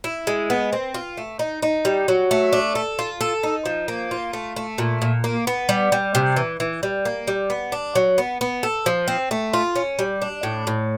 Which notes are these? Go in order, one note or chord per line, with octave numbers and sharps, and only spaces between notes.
E4
G#3
B3
C4
F4
A3
D#4
D#4
G3
F#3
A3
D4
A4
F4
A4
D#4
F3
A#3
F4
A3
A3
A#2
A#2
A#3
B3
G3
G3
C3
E3
E3
G3
A#3
G3
B3
D4
F#3
B3
B3
A4
F3
C4
A3
F4
C#4
G3
D4
A2
A2